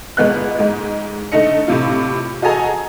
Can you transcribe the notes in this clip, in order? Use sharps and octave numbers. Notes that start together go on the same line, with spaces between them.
G1 G#3 B3 F#6
G#2 G#3
D3 A3 D#4 D#5 C#7
A2 C3 F4
F#4 G#4 A4 D#5 G#5 A#5